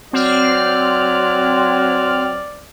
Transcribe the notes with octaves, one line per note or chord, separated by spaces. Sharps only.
F#3 C4 D5 F6